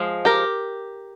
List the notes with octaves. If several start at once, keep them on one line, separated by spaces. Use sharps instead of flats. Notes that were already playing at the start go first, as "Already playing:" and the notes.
Already playing: F3 G#3
G4 A#4